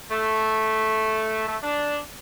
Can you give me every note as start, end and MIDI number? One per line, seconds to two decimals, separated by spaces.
0.11 1.44 57
1.49 1.58 57
1.63 1.98 62